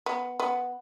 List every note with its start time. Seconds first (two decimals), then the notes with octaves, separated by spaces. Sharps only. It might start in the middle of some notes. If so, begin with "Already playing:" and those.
0.06 B3
0.40 B3